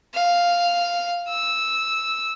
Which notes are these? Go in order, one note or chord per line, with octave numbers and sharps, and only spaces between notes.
F5
E6